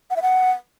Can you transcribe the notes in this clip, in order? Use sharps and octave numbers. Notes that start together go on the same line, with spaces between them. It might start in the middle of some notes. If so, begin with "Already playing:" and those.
F#5
E5
F#5